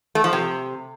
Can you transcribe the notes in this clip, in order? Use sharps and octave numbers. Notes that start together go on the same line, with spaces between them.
A3
F3
C3